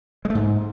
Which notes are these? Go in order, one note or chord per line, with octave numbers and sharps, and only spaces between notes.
G#3
A3
G#2